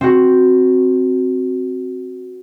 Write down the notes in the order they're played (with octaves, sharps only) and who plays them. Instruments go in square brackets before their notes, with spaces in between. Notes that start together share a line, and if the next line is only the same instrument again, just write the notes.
[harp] C4 F#4